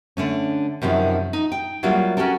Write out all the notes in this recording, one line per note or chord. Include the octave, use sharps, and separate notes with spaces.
D3 A3 C#4
F#2 C3 D#3 F3
D#4
G5
F#3 G3 A#3 E4 F4
C#4 F#4 G4 A4 A#4